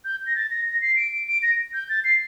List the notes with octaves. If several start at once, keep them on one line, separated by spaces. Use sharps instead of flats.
G6
A#6
A6
A#6
A#6
C7
D7
D7
D7
A#6
G6
A6
C7